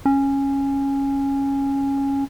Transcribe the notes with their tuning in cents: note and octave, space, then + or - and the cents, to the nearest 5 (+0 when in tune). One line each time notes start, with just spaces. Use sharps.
C#4 -10